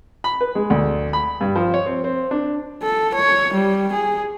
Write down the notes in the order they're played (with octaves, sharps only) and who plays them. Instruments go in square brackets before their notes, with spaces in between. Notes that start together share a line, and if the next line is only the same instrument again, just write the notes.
[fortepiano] B5
B4
G#3
D2
B5
G2
F3
C#5
C4
C4
D4
[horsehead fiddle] A4
C#5
G3
G#4